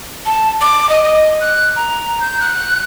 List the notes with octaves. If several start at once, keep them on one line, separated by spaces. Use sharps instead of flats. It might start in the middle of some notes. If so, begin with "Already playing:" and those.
A5
D6
D#5
D#5
F#6
A#5
G6
F#6